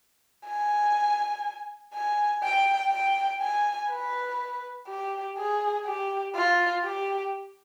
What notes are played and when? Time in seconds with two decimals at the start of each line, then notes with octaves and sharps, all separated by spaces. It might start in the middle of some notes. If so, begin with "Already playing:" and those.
0.47 G#5
1.94 G#5
2.43 G5
2.92 G5
3.42 G#5
3.90 B4
4.88 G4
5.38 G#4
5.86 G4
6.35 F4
6.84 G4